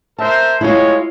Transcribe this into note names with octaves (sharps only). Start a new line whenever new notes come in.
A#4 C5 E5 A5
G#3 E4 F4 C#5